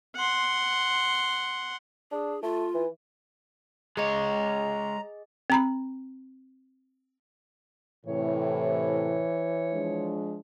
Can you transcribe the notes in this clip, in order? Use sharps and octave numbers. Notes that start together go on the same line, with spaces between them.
F#5 C6
D4 G#4
A3 F4
E3
G#3 G#4 C#5 D#5 A#5
C4 A#5 B5
A2 C3 E3 C#5
F3 G#3 D4